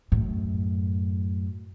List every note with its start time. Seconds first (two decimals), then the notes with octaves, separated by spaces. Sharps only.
0.12 F#2 A2